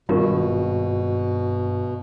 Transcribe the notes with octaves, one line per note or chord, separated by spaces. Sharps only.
G#1 G2 B2 F4 A#4 C#6